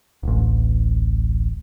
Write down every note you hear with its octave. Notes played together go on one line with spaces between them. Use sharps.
D1 A1